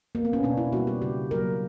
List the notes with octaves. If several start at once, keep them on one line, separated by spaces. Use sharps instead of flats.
A#3
B3
C#4
B2 D4
E4
G3 A#3 F#4
G4
C#3 G4
F#3 A#3 A#4